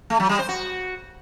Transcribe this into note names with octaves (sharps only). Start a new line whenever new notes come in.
A3
F#3
G3
C5
F#4